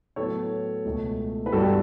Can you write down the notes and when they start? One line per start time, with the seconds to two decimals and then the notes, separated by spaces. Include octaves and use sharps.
0.16 A2 F#3 B3 A4 C#5
0.85 C#2 B2 A3
1.46 B4
1.52 G2 E3 G3 B3 F#4 A4
1.65 A4